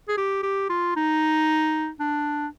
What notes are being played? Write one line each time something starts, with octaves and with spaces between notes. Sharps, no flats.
G#4
G4
G4
F4
D#4
D4